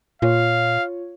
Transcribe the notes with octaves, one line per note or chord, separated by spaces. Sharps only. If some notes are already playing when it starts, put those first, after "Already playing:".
A#2 F4 C#5 F5